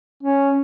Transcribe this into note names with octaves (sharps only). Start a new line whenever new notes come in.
C#4